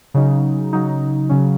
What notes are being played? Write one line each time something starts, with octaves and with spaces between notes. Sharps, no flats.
C#3 F#3 D#4
C#3 F#3 D#4
C#3 F#3 C#4